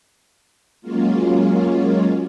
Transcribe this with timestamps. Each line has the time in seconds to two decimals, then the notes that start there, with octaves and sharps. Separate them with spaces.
0.82 F#3 G#3 A#3 C#4 F4